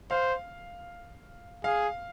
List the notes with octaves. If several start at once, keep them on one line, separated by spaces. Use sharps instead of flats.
C5 F5
G#4 F5